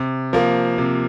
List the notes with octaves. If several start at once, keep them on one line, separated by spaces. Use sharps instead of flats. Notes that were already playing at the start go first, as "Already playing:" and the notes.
Already playing: C3
F3 A#3
C3